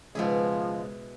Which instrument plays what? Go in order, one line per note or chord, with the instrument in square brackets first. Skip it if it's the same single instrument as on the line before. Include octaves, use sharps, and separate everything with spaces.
[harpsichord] C#2 G#2 [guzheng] B2 E4 G#4 [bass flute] F3 [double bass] G#3